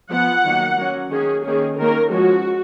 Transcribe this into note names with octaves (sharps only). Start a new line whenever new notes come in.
F3 B3 F#5
D#3 F#3 A#3
F#3 A#3 C#4
D#3 A#3 C#4 G#4
D#3 A#3 C#4 G#4
D#3 A#3 C#4 A#4
F3 G#3 C#4 F#4